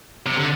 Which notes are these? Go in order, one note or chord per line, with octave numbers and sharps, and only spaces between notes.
C3
D3